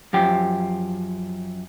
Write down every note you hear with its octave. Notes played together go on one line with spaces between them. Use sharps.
F#2 F3 G4